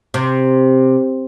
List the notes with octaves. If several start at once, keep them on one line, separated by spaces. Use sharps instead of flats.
C3